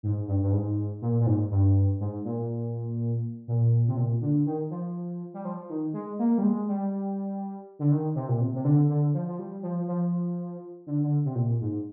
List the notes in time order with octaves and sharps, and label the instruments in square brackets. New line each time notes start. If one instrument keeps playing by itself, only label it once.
[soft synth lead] G#2
G2
G2
G#2
A#2
A#2
G#2
G2
G#2
A#2
A#2
C3
A#2
D3
D#3
F3
G3
F3
D#3
G#3
A#3
G3
G#3
G3
D3
D#3
C3
A#2
C3
C3
D3
D3
F3
F3
G3
F3
F3
D3
D3
C3
A#2
G#2